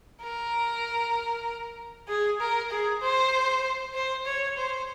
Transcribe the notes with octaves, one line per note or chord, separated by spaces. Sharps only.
A#4
G#4
A#4
G#4
C5
C5
C#5
C5